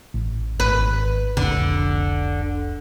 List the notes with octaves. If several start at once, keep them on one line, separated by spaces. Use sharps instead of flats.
A1
G#1 B4
F1 C2 D3